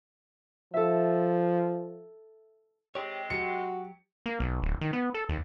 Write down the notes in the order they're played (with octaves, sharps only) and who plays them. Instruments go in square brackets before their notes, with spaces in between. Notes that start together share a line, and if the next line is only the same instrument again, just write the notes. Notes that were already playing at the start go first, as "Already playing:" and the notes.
[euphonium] F3 [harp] A4 E5
[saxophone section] C3 G#3 [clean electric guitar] G4 C#5
[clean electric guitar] F#3 G4 [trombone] F#4 [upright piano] C#7
[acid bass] A#3
B1
D1
D#3
B3
A4
D#2